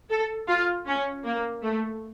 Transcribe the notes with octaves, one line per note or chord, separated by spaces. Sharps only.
A4
F4
C#4
A#3
A3